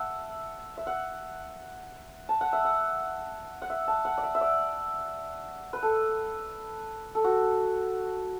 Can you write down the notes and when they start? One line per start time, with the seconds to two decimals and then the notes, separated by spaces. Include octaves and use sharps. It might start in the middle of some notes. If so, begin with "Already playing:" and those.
Already playing: E5 F#5 A5
0.77 E5
0.87 F#5
2.29 A5
2.41 F#5
2.53 E5
2.65 F#5
3.62 F#5
3.70 E5
3.88 A5
4.05 F#5
4.18 D5
4.23 E5
4.35 E5
4.41 D5
5.73 B4
5.83 A4
7.15 A4
7.24 F#4